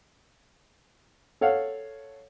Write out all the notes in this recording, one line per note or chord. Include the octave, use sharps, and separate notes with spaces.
A4 C#5 F5 F#5